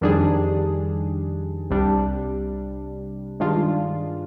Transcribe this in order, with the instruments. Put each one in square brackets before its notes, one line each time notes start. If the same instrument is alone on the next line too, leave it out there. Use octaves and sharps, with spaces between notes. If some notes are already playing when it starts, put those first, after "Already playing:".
[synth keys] F2 D#3 G3 D4 G#4
C2 C3 G3 D4
G2 D#3 G#3 D4 F4